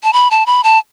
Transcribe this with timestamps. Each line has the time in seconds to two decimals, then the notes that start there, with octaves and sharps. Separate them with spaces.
0.04 A5
0.13 B5
0.31 A5
0.46 B5
0.64 A5